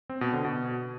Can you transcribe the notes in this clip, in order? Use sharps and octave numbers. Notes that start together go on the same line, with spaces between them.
C4
B2
D3
B2